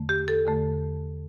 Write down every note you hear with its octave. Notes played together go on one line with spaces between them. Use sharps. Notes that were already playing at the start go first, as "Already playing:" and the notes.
Already playing: E2 D3 A3
G4
A4
E2 D3 A3